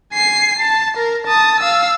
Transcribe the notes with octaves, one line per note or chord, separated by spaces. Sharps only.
G#5 C7
A5
A#4
A5 D#6
F5 E6